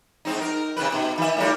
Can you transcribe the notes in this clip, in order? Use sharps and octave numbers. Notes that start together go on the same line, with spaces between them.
G#2 C4 D#4
A#4
C3 D#3 B4
B2
D#3 E5
A2 G3 A#4